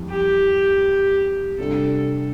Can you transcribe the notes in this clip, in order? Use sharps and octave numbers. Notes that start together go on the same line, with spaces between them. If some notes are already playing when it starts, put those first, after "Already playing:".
Already playing: F2 E3 G3
G4
C3 G3 D4 F4 A4